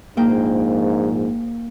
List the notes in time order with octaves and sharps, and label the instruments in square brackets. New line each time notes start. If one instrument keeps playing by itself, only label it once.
[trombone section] A#1 G#2 [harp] A#3 G5